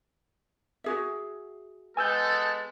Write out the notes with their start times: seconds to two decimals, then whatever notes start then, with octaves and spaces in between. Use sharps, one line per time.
0.84 F#4 G#4 E5
1.97 G#3 B3 A4 G#5 E6 G6